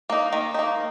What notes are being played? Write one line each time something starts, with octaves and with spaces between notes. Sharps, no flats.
A#3 D#4
D#3
A#3 D#4